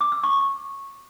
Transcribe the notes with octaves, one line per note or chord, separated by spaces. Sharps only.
D6
E6
C#6